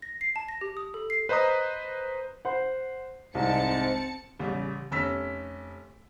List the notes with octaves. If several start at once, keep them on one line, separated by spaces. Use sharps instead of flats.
A#6
C7
A5
A#6
G4
D#6
A4
C7
B4 C5 D#5 A#5 D#6
C5 F#5
C2 G#2 C4 A5 C#7
A1 C#3 G3
F1 C#4 E6 B6